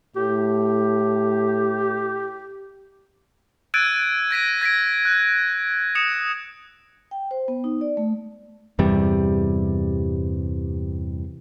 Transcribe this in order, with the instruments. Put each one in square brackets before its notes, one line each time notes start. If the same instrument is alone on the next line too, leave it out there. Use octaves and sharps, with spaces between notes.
[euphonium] A2 [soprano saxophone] G4
[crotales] E6 F#6 G#6 A6 D7 D#7
G#6 A#6 B6 D#7
G#6 A#6 B6 D7
F#6
D#6 C#7 E7
[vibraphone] G5
C5
B3
D#4
D5
A3
[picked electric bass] E2 G2 C3 G3